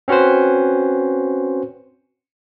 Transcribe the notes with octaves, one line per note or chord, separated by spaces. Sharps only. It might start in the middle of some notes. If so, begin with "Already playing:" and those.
C4 C#4 F#4 B4 C5